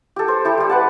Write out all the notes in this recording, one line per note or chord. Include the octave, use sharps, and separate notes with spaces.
G4 A4
C5
E4 G4 A4
G3 G4
B4 F#5 A5